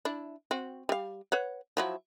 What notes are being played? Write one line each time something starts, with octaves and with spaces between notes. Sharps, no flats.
D4 E4
C4 F#4
G3 F5
B4 C#5 F#5
F3 F#3 E4